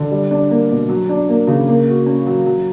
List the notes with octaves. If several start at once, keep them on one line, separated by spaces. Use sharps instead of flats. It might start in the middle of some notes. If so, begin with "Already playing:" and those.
Already playing: D3
G3
D4
A#3
B2
F#3
D4
A#3
C#3
A#3
F#4
C#4
F#3
F#3